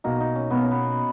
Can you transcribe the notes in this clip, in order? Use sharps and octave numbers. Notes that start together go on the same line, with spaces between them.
B1 B2 A#3 D#4 F#4
D#4
C#4
B1 B2 A#3 B3
C#4
B3